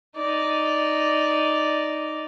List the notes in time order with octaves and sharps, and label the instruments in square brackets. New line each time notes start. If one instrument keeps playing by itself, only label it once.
[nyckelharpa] D#4 D5